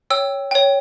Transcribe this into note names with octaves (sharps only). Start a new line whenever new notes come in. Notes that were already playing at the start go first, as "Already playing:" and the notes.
C#5 G5 E6
C#5 G5